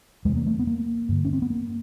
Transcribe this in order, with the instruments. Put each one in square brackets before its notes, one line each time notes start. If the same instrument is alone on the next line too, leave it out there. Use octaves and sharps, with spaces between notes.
[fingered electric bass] E2 C3 G#3
A#3
A3
B3
A#3
G2 D3
C#4
C4
B3
A#3